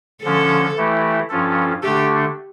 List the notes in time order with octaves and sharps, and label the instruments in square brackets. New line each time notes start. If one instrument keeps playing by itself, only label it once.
[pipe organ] D3 F3 C#4 [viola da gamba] A4
[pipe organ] E3 A3 E4 G4
G2 F3 C#4 F4 A4
[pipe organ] D3 A3 D4 A4 [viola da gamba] G4